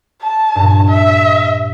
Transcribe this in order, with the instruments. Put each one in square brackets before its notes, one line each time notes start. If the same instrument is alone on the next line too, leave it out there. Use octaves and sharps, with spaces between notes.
[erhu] A5
[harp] G2 A#2
[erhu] E5